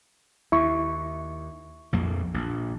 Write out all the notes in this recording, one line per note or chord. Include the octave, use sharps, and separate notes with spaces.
D#2 E4 C#6
A#1 F2 A#3
A#1